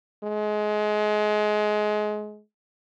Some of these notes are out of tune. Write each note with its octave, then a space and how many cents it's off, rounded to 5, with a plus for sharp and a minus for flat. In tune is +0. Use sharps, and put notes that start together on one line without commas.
G#3 +25